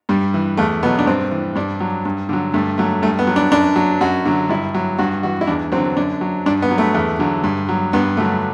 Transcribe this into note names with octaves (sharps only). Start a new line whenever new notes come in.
G2 G3
E3
E2 A3
B2 F#3 B3
D4
G2 C4
E3
G2 D4
F#3
G2
D3 F#3
G2 A3
F#3 A3
G2 A3
B3
F#3
D4
F#2 D4
F#3
F#2 F#4
D3 F#3
G2 E4
F#3
G2 F#4
E3 F#4
E4
E2 D4
F#3 C4
D3
F#2 D4
F#3
G2 D4
B3
F#3
A3
E2
D3 F#3
G2
F#3
G2 B3
D3 F#3 A3